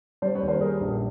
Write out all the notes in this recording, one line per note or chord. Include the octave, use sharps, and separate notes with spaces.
G3 C5 D5
B4 C#5
D#2
A#4 C5
G3 G#4 A#4
A#1